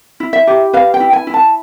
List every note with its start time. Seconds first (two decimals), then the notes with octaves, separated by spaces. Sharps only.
0.20 E4
0.33 E5
0.47 G4
0.73 B4 F5
0.94 G5
1.00 E4
1.13 G#5
1.27 E4
1.34 A5